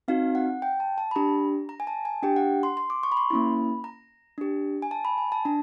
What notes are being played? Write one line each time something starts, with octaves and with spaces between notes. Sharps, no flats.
C4 D#4 F#4 F5
F#5
G5
A5
A5
B5
D4 G4 A#5
A#5
G#5
A5
G#5
D4 G4 G5
F#5
C6
C6
D6
C#6
B5
C6
A#3 C#4 E4 B5
A#5
D4 G4
G#5
A5
B5
G#5
A5
D4 A#5